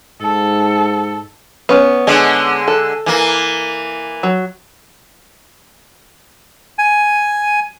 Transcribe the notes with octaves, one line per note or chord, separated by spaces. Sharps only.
G#2 A4
B3 C#4
D3 G#3
A4
E3 A#3
F#3
G#5